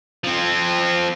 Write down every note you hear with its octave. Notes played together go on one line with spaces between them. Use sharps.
F3 C4